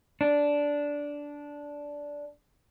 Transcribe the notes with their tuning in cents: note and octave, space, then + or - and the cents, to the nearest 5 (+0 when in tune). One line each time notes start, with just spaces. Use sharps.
D4 -10